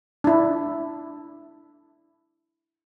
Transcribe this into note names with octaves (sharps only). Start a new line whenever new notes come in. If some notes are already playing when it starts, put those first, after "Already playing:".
D4 E4